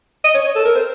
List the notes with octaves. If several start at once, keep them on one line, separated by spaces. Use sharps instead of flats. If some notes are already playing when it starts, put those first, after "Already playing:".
D#5
C#5
C#5
A4
A#4
C5